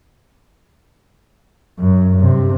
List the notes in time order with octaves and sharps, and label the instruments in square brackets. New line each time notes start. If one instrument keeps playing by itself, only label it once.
[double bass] F#2
G2 C3